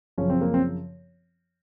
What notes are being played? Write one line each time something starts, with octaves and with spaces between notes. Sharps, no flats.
F#2 C#3 F3 C#4
C4
A#3
C4